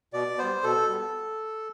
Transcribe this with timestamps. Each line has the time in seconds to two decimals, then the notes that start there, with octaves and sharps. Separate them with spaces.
0.13 B2 D5
0.38 G3 B3 C5
0.63 B2 A4
0.89 G3 B3